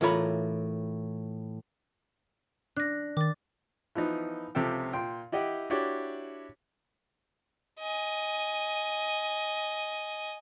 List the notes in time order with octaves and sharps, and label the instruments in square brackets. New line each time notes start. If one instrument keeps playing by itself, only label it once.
[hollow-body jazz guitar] A2 E3 F4 A#4 C#5 B5
[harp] D4 [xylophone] F#6 A#6
[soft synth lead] D#3 [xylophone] D6 A6
[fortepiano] E3 F3 B3 D#4
C#2 C3 F3 G4 A4 G5
A#2 G5 C6
E4 G4 D#5 F#5 G5
D4 E4 F#4 G4 C#5
[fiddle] D#5 G#5